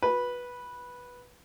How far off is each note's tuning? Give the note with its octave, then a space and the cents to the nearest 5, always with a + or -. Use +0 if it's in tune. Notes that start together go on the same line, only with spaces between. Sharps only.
F#4 -25 B4 -10